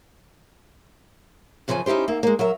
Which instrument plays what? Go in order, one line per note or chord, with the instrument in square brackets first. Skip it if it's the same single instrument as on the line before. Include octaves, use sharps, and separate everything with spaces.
[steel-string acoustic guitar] F#2 C#3 F3 A4 G#5
C#4 D#4 E4 G4 C5
G#2 A#3 E5
G#3 A#3
F#3 A#4 E5